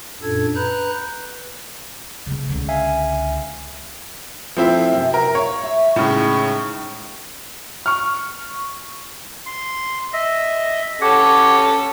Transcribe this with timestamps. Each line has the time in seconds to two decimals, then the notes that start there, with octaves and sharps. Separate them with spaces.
0.22 F#2 A#2 D4 A4 G#6
0.55 B4 A#5 B5 F#6 G6
2.26 C#3 A3
2.49 C#2 D3
2.69 E5 F5 G#5
4.57 F3 A3 C4 E4
4.92 F#2 C3
5.14 A#4
5.35 C#5 F5
5.63 E5
5.96 A2 C#3 G#3 D#4
7.86 C#6 F6
9.46 C6
10.13 D#5 E5
11.01 C#4 G4 A4 C#5 F#5